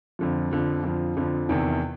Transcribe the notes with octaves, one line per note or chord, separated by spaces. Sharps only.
F2 D3 F3
F2 D3 F3
F2 D3 F3
F2 D3 F3
E2 C3 D#3